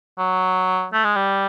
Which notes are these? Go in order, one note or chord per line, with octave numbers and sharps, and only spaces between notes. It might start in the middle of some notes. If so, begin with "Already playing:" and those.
F#3
A3
G#3
G3